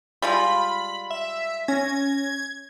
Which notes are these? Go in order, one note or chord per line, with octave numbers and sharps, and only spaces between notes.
G3 G#3 F4 B5
E5
C#4 G#6 A#6